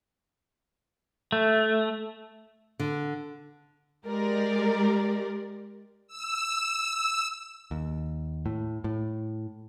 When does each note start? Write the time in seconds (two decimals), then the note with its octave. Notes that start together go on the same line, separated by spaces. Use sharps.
1.32 A3
2.79 D3
4.06 G#3 G4 A#4 D5
6.07 E6
7.71 D#2
8.46 A2
8.84 A2